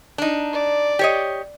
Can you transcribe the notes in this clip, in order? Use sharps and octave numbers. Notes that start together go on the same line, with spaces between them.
D4 D#4
D5
G4 C#5 D#5